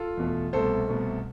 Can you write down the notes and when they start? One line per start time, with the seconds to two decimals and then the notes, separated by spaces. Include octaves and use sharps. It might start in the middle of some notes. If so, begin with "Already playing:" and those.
Already playing: F4 A4
0.17 E2 B2 A3
0.53 C2 B2 A3 A4 C5
0.88 C2 B2 A3